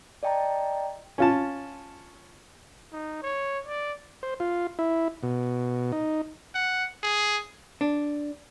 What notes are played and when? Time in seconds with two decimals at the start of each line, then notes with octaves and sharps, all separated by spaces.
0.23 D5 D#5 G5 A5 A#5
1.18 C#4 F4 A5
2.93 D#4
3.22 C#5
3.67 D5
4.23 C5
4.40 F4
4.79 E4
5.23 B2
5.92 D#4
6.55 F#5
7.03 G#4
7.81 D4